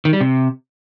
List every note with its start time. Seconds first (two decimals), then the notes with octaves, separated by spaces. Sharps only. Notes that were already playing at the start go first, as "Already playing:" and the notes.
0.05 D#3
0.13 G3
0.21 C3